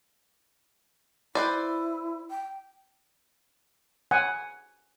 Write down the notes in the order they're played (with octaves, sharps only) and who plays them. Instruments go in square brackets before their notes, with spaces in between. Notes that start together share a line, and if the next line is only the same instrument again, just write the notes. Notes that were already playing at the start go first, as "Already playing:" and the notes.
[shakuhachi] E4 [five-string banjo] B4 C5 D5
[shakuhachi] G5
[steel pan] F#5 G#5